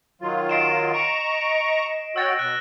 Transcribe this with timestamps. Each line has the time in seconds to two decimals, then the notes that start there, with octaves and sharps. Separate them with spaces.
0.21 D#3 F#3 F4
0.49 D#5 C7 D7 E7
0.94 A#5 C#6 D7
2.16 F#4 C#5 G5 E6 A6 A#6
2.39 B2 F#6 A#6